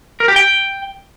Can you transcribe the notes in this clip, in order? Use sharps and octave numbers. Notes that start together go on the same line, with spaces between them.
A#4
G4
G5